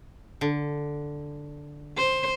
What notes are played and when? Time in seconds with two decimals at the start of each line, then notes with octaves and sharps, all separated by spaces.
0.41 D3
1.97 C5